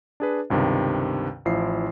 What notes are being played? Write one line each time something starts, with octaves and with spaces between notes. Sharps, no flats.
D4 G#4 B4
C#2 G2 C3 D#3
A1 F3 E4 C7